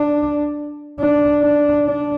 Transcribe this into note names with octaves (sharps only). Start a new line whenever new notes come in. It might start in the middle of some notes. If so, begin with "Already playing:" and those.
Already playing: D4
D4
D4
D4